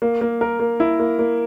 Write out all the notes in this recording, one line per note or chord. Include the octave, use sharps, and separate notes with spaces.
A#3
A#3
A#4
A#3
E4
A#3
A#3